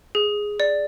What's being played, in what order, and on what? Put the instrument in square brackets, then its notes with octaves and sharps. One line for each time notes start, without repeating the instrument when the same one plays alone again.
[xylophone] G#4
D5